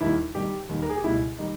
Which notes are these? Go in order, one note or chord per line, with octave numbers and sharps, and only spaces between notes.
D#2 D#3 G3 E4
G2 D#3 G3 G4
D#2 D#3 G3
A#4
G#4
G4
C#2 B2 G3 E4
D#3 G3 D#4